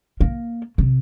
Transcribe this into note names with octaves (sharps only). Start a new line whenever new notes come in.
A#3
C3